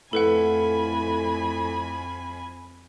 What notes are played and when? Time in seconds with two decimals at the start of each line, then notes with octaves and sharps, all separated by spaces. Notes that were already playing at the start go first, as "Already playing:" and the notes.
0.13 F2 A2 A4 B4 F#5 G#5 B5